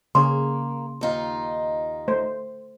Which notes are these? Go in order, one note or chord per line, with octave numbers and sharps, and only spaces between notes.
C#3 A#3 C#4 G#4 C6
D#2 D#4 F4
A3 C5